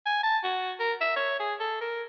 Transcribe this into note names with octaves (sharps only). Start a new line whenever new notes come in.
G#5
A5
F#4
A#4
E5
C#5
G#4
A4
A#4